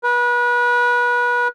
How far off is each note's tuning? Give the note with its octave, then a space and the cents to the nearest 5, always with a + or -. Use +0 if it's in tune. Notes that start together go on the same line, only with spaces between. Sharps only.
B4 -30